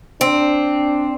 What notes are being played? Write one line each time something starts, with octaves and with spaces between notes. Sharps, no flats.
C4 D4